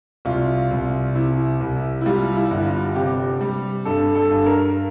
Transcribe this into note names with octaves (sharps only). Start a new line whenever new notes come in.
C2 F4
C2
C3 E4
C2
E4
G3 F4
E4
G1
F4
C3 G4
G3
G2 A4
A4
G2
A#4